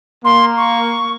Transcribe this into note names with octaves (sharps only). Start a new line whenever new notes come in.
A#3 C6
C#6